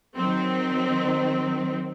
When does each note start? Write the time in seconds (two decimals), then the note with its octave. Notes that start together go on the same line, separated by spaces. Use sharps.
0.16 D#3 F#3 C4